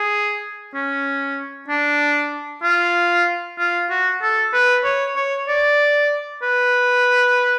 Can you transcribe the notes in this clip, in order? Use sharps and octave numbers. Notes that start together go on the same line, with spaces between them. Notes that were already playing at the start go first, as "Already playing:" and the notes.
Already playing: G#4
C#4
D4
F4
F4
F#4
A4
B4
C#5
C#5
D5
B4